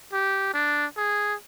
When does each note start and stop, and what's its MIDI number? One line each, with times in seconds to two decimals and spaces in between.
0.13 0.52 67
0.54 0.86 62
0.97 1.35 68